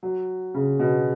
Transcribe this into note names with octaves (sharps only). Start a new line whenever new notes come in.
F#3
C#3
B2